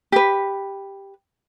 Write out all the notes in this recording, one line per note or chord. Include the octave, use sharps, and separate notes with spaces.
G4 B4